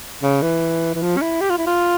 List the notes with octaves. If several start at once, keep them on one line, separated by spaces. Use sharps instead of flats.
C#3
E3
E3
F3
C#4
E4
G4
F4
E4
F4